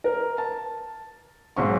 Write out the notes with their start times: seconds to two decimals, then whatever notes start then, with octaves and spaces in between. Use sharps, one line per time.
0.04 A#4
0.38 A5
1.56 B1 G#2 C#6